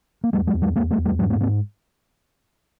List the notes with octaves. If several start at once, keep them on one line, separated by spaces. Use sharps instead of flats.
A#3
E2 G3 A3
F#3 G#3
E2
F#3 G#3
E2 G#3 A#3
G3 A3
E2
G3 A3
G#2 F#3 G#3
A3 B3
G#2 A#3 C4